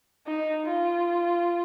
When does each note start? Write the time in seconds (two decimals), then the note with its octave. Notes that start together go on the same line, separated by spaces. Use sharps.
0.27 D#4
0.66 F4